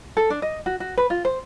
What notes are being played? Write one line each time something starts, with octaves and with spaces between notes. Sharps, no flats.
A4
D4
D#5
F#4
F#4
B4
F4
C5